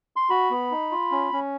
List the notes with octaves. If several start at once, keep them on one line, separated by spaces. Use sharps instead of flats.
C6
F#4 B5
B3
D#4
F4
C#4
C#4